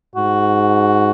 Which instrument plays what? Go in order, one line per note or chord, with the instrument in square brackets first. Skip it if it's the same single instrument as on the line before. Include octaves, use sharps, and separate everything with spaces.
[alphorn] G#2 [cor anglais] F#4